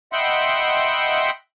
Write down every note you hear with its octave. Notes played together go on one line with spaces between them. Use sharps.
D#5 E5 F#5 G5 B5 C6